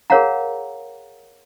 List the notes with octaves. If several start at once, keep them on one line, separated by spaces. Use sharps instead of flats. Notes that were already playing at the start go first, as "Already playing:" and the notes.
G#4 A#4 C#5 F5 F#5 A#5